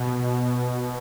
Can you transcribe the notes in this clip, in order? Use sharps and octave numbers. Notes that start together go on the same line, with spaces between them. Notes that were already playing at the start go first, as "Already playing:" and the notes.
Already playing: B2